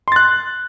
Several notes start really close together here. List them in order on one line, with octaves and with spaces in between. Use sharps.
C6 A6 F#6